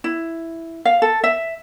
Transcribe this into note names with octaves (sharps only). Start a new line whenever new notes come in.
E4
F5
A4
E5